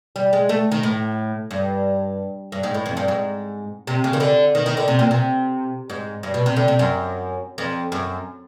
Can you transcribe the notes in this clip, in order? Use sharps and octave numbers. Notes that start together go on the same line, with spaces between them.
G3
G#3
A3
D#3
A2
G2
G2
G#2
A2
F2
G2
G#2
C3
C#3
D#3
D3
D#3
D#3
D3
C3
A#2
C3
G#2
G2
B2
C3
D3
C3
F#2
F2
F#2